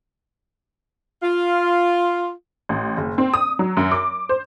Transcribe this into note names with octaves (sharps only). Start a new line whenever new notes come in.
F4
A1
F#1
C4
D#6
F#3
F#2
D6
C5